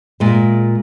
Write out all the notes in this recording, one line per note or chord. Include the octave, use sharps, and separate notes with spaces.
A#2 G#3